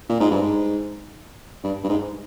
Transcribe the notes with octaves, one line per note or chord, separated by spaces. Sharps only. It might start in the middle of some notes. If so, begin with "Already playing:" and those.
A#2
G#2
G2
G#2
G2
G2
G#2